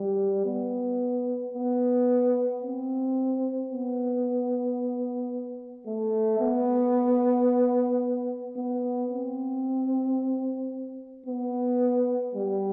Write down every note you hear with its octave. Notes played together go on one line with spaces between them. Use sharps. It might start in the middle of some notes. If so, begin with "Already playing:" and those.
Already playing: G3
B3
B3
C4
B3
A3
B3
B3
C4
B3
G3